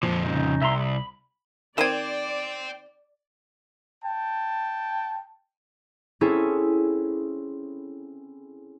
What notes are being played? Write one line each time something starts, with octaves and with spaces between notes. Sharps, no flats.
F2 A#2 F3
C#3 D#4
C2 E5 A#5 C6
B5
D#3 C4 C5 D5 G5 G#6 D#7 E7
G5 A5
C4 C#4 E4 G#4 A4